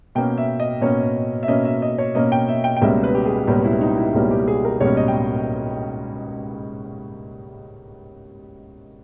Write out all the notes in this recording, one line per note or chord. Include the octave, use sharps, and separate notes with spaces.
B2 A#3 C#4 G5
E5
D#5
B2 A#3 C#4 C#5
E5
B2 A#3 C#4 D#5
E5
D#5
C#5
B2 A#3 C#4 D#5
G5
E5
G5
G5
C#2 B2 G3 A#3 C#4 E5
B4
G4
G#4
C#2 B2 G3 A#3 C#4 G4
E4
D#4
E4
C#2 B2 G3 A#3 C#4
G4
G#4
A#4
C#2 B2 G3 A#3 C#4 C#5
D#5
G5